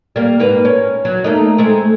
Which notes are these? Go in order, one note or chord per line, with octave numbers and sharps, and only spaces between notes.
G3 A#3
G#2 A#3 B4
C#4
F#3
A3 A#3 D#4
G#3 A3 C4